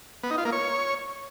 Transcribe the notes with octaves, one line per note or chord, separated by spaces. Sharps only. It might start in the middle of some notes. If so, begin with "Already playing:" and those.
B3
D#4
F4
A#3
C#5